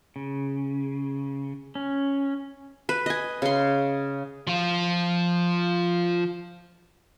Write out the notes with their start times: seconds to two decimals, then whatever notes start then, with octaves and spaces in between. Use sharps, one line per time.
0.16 C#3
1.75 C#4
2.89 B4
3.06 D#5 G#5
3.42 C#3 C6
4.47 F3 F4